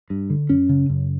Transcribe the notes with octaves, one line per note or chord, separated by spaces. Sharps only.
G2
D3
F#2 C#4
C#3
F#2